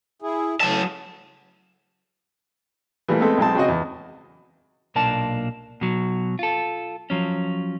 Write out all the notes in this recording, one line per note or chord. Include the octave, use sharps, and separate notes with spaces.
E4 G#4
A2 C#3 F#3 A5
E3 G3 A3 A#3 E4
G#3 A3 B3 C4 A4
B1 G#3 C4 A5
C#3 C4 F#4 D#5
E2
B1 A#2 A#3 D4 A5
B2 F#3
F4 A4
F3 F#3 C#4